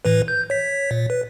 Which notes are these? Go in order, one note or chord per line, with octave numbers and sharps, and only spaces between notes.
A2 E3 B4
G6
C#5 B6
A#2
B4